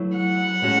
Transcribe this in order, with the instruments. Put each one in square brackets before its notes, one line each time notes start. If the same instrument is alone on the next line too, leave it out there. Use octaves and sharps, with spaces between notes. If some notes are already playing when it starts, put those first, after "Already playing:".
Already playing: [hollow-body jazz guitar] F#3 A3 E4 B4
[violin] F#5
[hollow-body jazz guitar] A2 G#3 C#4 F#4